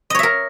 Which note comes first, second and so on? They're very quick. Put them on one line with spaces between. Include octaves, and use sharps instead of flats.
D#5 C#5 E5 A#4